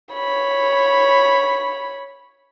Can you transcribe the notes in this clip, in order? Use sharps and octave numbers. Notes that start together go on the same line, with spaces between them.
C#5 B5